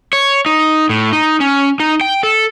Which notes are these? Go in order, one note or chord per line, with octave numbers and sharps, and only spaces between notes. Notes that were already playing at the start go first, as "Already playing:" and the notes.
C#5
D#4
A2
D#4
C#4
D#4
G5
A4